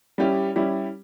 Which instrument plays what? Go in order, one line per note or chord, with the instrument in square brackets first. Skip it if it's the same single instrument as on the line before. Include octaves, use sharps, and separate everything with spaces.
[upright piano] G3 C#4 E4 G4
G3 C#4 E4 G4